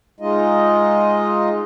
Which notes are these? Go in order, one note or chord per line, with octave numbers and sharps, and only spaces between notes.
G#3 D#4 F4 D#5